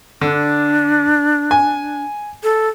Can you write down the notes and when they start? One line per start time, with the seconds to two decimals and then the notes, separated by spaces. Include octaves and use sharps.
0.22 D3 D4
1.51 G#5
2.43 A4